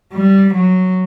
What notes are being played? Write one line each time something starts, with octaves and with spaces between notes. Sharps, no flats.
G3
F#3